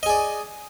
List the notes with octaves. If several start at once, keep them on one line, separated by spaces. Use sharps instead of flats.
G#4 D5 D#5